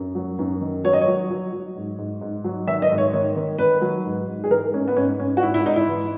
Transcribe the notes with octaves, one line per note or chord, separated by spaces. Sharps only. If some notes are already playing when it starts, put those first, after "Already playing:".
Already playing: F#2
F#3
F#2
D#3
F#3 C#5
D#5
C#5
F#3
F#3
F#3
G#2
G#2
G#2
F#3
D#3 E5
D#5
G#2
C#5
D#3 C#5
D#3
D#3 B4
F#3
G#2
G#2
G#4
E3 A#4
G#2 C#4
B3
G#2 C#4
G#2 C#4
F#4
G#2 E4
E4
G#2 D#4
E4
E3